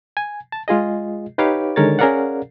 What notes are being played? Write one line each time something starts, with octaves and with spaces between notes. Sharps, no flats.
G#5
A5
G#3 F4 G#4 D#5
D#4 G4 B4 C#5 F5 D6
D3 D#3 G#3 A#4 C#5 A6
C#4 G#4 A#4 D5 F5 F#5